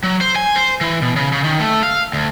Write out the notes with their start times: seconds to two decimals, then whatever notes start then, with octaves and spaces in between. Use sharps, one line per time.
0.03 F#3
0.21 C5
0.36 G#5
0.56 C5
0.81 E3
1.02 B2
1.16 C#3
1.32 C#3
1.44 D#3
1.60 A3
1.83 F5
2.13 D2